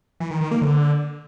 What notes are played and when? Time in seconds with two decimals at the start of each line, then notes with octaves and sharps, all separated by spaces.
0.20 E3
0.31 D#3
0.41 D#3
0.51 A#3
0.62 D3